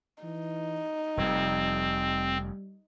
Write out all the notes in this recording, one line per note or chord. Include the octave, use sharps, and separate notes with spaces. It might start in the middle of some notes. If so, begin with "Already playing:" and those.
E3 D#4
F1 F2 G3 C4